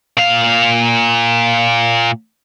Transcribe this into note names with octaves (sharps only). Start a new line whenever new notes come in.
A#2 F5